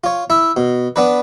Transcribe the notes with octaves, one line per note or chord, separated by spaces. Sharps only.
F4 C#5
E4 E5
B2
B3 D4 B4